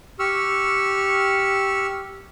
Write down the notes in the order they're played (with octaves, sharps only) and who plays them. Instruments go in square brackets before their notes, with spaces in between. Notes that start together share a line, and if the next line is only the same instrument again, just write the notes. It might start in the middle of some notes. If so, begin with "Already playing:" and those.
[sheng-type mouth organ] G4 C#6 E6 F6